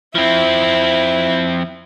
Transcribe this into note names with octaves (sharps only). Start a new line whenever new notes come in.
F3 C4 E4